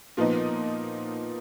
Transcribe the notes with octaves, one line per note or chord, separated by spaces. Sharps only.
A#2 F3 B3 D#4